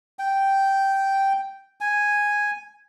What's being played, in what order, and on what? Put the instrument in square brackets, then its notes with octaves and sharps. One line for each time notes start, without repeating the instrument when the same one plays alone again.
[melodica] G5
G#5